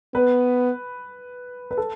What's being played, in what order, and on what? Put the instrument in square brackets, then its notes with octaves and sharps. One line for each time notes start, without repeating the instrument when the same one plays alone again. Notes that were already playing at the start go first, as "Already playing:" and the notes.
[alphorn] B3 [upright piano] B4
[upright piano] B4
A4